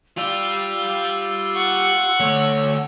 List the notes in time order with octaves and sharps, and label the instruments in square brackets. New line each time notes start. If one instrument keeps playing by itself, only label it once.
[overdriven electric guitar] F4 [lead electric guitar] G4 D5 [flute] E6
[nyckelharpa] F#5 C#6
[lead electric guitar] D3 A3 [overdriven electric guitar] C#5